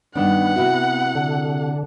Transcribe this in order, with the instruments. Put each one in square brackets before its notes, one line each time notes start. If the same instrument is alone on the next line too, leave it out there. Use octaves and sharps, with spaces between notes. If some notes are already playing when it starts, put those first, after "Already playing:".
[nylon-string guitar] G2 D#3 D4 [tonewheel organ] B3 [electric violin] F#5
[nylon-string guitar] C3 E4 F#4
[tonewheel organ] D3